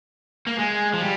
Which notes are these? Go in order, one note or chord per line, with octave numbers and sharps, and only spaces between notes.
A#3
G#3
F3
G3